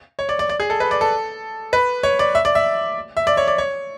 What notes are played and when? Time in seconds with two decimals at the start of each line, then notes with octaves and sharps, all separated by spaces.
0.19 C#5
0.29 D5
0.39 D5
0.49 D5
0.60 G#4
0.70 A4
0.80 B4
0.91 D5
1.01 A4
1.73 B4
2.03 C#5
2.19 D5
2.35 E5
2.45 D5
2.55 E5
3.17 E5
3.27 D5
3.37 C#5
3.48 D5
3.58 C#5